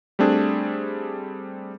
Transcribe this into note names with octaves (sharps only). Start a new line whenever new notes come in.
G3 A3 C4 D4 G#4